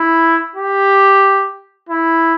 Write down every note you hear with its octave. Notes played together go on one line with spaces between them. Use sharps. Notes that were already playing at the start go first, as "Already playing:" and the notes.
Already playing: E4
G4
E4